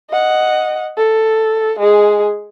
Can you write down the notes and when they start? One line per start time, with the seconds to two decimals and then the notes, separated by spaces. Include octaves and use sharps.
0.10 D#5 F#5
0.97 A4
1.79 G#3 G#4